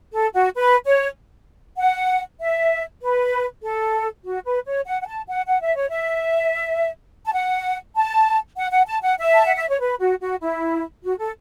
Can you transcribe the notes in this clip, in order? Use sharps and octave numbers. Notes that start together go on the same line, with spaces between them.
A4
F#4
B4
C#5
F#5
E5
B4
A4
F#4
B4
C#5
F#5
F#5
A5
F#5
F#5
E5
C#5
E5
A5
F#5
A5
F#5
F#5
A5
F#5
E5
A5
F#5
E5
C#5
B4
F#4
F#4
E4
F#4
A4